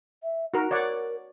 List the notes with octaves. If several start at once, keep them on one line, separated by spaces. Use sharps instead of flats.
E5
D#4 F#4 A#4
A#4 C#5 D5 F#5